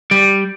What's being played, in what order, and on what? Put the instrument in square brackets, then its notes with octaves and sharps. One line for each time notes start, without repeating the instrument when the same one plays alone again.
[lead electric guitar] G3